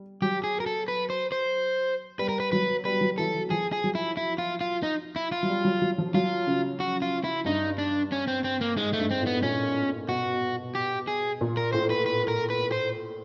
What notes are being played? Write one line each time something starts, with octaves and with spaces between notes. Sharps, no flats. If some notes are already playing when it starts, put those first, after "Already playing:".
Already playing: G3
F#3 G4
G#4
A#4
A4
B4
C5
C5
G3 B4
A#4
B4
F#3 B4
G3 B4
F#3
E3 A4
E3
F3 G#4
G#4
F#3
E4
E4
F4
F4
D#4
E4
F4
F#3
G3
F#3
F#3
F3
F#3 F4
C#3
F#4
F4
E4
G2 D#4
D4
C#4
C4
C4
A#3
G#2 G#3
A3
G2
C4
A2 B3
A#2 C#4
B2 F#4
G4
G#4
A#2
A#4
A2 C5
B4
B4
A#4
B4
C5